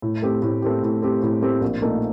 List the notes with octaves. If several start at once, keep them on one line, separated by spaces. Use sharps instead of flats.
A2
A3 C4 G4
A2
A3 C4 G4
A2
A3 C4 G4
A2
A3 C4 G4
A#1
A#2 A3 D#4 A4